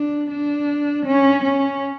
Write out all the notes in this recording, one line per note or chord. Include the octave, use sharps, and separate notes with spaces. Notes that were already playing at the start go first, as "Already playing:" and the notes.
Already playing: D4
D4
C#4
C#4